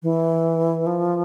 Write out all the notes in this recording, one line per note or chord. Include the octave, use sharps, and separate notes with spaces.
E3
F3